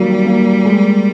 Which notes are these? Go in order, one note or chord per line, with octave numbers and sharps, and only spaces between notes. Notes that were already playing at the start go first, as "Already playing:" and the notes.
Already playing: D#3 F#3 G3 A#3
A#3
G#3